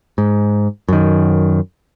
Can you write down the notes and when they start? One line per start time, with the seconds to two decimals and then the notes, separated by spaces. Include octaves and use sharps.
0.18 G#2
0.88 F#2 D#3